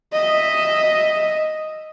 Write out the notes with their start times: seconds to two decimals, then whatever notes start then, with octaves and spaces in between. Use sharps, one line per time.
0.13 D#5 E5